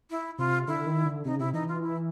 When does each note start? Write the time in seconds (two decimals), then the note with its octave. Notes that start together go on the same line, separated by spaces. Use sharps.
0.10 E4
0.38 C3 F4
0.68 D3 E4
0.86 D#3
1.05 D3
1.25 C3 D#4
1.33 C#3
1.39 C3 E4
1.53 E3 D#4
1.68 F4
1.83 E4